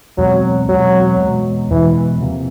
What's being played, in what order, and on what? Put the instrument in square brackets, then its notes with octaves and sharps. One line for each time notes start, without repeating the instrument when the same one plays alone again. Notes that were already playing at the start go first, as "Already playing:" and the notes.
[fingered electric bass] E2 B2 G#3 C4 [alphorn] F#3
[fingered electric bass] E2 B2 G#3 C4 [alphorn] F#3
[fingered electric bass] E2 B2 G#3 B3
[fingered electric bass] E2 B2 G#3 B3 [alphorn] E3
[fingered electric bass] C3 F3 A#3